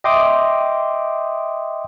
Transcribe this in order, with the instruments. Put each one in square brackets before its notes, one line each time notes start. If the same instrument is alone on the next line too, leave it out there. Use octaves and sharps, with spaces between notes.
[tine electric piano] D#5 E5 G5 C6 D6 D#6